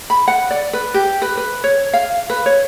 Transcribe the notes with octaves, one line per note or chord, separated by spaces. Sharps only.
B5
F#5
D5
B4
G4
B4
B4
C#5
F5
B4
C#5